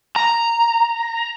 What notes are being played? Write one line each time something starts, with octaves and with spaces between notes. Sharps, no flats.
A#5